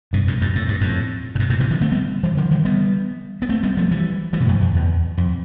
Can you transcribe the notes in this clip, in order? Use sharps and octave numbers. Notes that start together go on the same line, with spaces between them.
G2 B2
F2 A2
E2 G2
A2
G2
F2 A2
A2
G2 B2
A2 C3
C3 E3
D3 F3
A3 C4
G3 B3
E3 G3
D3 F3
E3 G3
G3 B3
B3
A3 C4
G3 B3
F3 A3
E3 G3
E3 G3
B2
F2 A2
F2
E2
F2